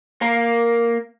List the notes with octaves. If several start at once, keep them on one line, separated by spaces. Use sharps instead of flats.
A#3 A#4